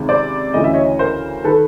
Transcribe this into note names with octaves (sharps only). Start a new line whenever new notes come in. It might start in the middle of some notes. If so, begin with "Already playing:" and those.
Already playing: C#2 C3 D#3
C5 D5
D2 C#3 E3 D#5
E5
C#5 D#5
A#4 C5
D#3 A4 B4